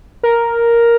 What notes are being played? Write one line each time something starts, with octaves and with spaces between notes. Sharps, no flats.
A#4